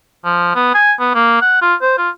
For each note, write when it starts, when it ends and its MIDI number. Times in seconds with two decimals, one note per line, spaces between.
0.25 0.51 53
0.55 0.74 59
0.74 0.92 80
1.00 1.12 59
1.15 1.38 58
1.41 1.59 78
1.61 1.74 65
1.82 1.93 72
1.97 2.09 65